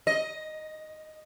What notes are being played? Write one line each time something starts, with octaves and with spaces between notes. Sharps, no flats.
D#5